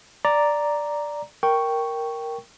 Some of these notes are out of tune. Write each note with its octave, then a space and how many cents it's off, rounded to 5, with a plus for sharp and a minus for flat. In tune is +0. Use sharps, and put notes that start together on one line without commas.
D5 +0 A#5 +0
A#4 +0 G5 -5 C#6 +0